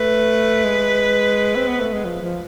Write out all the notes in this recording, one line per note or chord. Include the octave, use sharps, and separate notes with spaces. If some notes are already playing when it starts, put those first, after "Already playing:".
Already playing: A3 B4
G#3
C4
B3
A3
G#3
F3
F3